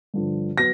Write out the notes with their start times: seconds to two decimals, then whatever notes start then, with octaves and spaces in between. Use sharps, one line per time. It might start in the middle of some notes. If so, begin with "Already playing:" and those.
0.14 G2 D3 F3
0.57 F#3 B3 A#6